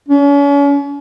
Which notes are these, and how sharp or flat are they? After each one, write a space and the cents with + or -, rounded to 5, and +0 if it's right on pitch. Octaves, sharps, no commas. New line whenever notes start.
C#4 +40